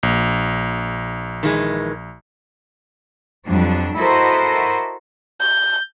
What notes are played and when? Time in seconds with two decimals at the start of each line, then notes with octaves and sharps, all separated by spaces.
0.03 A#1
1.43 D#3 E3 G#3
3.46 F2 F#3 G3 D4
3.96 E4 F#4 A4 A#4 C5 D#5
5.40 G6